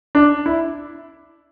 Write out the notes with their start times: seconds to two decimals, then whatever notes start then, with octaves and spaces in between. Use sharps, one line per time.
0.15 D4
0.46 E4